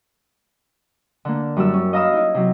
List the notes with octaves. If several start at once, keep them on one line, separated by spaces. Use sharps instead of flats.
D3 A#3
F#2 G3 E4 E6
C#4
D#5 F5 A#5 B5 D#6 E6
D#4 E4
C3 F#3